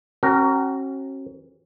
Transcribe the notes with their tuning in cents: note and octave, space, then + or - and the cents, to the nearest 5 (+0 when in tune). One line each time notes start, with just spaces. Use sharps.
C#4 -40 F#4 +30 A#4 -10